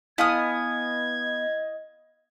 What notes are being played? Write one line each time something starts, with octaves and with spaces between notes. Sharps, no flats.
B3 E4 D#5 F5 G#5 D#6 F6 G#6